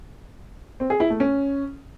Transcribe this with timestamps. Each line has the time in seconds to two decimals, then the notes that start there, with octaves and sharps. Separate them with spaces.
0.80 C4
0.90 G#4
1.00 E4
1.10 A3
1.20 C#4